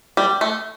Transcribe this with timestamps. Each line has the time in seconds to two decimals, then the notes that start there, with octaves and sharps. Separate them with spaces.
0.17 G3
0.41 A3